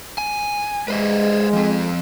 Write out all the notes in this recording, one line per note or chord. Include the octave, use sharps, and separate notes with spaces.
G#5
G#3 B4 C5 D#5
F3 C4